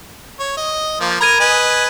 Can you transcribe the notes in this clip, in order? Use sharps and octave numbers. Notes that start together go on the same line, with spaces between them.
C#5
D#5
F3 A#3
A#4 A#5 B5 G#6 D#7
B4 D#5 G#5